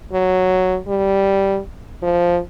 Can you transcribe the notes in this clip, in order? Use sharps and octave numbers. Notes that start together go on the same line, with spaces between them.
F#3
G3
F3